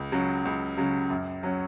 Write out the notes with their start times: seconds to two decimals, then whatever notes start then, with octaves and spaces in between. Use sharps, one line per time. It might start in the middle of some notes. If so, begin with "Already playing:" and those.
Already playing: C#2
0.12 C#3 F#3
0.45 C#2
0.77 C#3 F#3
1.10 F#2
1.43 F#3 C#4